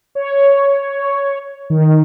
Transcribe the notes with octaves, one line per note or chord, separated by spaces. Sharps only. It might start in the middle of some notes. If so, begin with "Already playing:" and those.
C#5
D#3